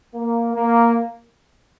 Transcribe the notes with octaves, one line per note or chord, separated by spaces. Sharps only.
A#3
A#3